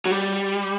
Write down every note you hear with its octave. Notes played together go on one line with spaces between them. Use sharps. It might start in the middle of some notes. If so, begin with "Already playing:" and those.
F#3
G3